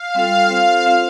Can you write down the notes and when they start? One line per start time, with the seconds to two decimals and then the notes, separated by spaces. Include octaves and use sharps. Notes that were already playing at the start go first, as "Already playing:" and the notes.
Already playing: F5
0.15 G3 C4 F4 A4
0.50 C4 F4 A4 C5 F5
0.86 C4 F4 C5 F5